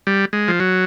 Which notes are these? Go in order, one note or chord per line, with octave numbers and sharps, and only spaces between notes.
G3
G#3
F3
F#3